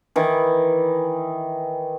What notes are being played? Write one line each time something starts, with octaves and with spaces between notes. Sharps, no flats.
D#3 E3